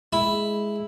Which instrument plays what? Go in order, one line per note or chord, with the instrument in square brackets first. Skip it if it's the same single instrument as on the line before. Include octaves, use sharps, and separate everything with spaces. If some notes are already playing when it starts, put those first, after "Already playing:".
[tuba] G#3 [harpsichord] E4